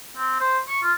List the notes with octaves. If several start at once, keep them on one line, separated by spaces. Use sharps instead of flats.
C4
C5
C#6
F4